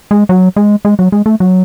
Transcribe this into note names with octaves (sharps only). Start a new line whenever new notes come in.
G#3
F#3
G#3
G#3
F#3
G#3
A3
F#3